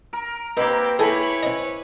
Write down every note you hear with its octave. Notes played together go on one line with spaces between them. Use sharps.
A#4
A#3 C4 D#4 G4 B4
E4 G#4 A4 B4 C#5 G#5 B5
C4 D#5